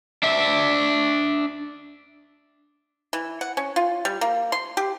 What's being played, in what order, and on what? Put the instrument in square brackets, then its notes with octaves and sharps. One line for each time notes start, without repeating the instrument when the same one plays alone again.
[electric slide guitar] D4 E5
[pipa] E3
F#5
C#4
F4
G3
A#3
C6
G4